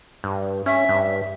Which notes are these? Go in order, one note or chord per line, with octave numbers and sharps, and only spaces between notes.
G2
C#4 E5
G2